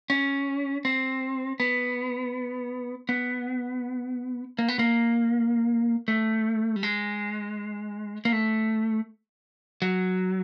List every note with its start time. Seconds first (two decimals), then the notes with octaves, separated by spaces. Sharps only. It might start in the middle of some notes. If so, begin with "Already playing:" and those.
0.10 C#4
0.85 C4
1.60 B3
3.09 B3
4.59 A#3
4.68 B3
4.79 A#3
6.08 A3
6.76 G3
6.83 G#3
8.25 A#3
8.32 A3
9.82 F#3